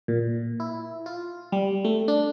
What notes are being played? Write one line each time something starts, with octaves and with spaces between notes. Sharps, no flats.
A#2
E4
F4
G3
A3
D4